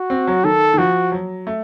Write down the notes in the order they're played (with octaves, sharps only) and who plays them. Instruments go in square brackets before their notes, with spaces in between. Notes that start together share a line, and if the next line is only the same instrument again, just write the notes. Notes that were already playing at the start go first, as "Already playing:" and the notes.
Already playing: [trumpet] F#4
[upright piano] C4
F#3
[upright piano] D#3 [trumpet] A4
[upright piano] D#3
[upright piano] F3 [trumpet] F#4
[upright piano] F#3
A3